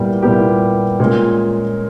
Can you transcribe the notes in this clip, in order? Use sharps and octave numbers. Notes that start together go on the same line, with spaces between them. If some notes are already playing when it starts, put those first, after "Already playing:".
Already playing: A#2 G3 B3 E4 G4
A#2 G3 B3 E4 G4
A#2 G#3 C#4